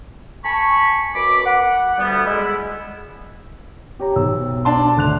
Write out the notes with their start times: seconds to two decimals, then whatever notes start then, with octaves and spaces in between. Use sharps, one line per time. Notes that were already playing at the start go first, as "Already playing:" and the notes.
0.44 G#5 A5 B5 C#6
1.14 F#2 B2 B5 D6
1.46 F#5
1.98 D2 G3 B3
2.26 G#3 E4
3.99 G4 C#5 A#5
4.16 B1 C5 E6
4.65 D4 A5 C6
4.97 D2 F#6 F7